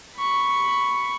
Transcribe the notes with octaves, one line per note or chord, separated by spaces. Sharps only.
B5 C#6